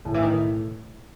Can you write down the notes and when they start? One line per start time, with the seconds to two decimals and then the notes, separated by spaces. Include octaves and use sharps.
0.05 A2 D#3
0.14 E3
0.22 D#3
0.39 B2